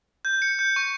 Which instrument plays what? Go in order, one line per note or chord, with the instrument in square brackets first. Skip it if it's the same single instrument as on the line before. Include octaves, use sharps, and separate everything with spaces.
[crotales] G6
C#7
G6
C#6